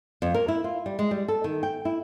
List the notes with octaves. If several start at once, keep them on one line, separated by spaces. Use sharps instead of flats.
F2
A#4
E4
F4
G3
G#3
G3
A4
D#3
G5
E4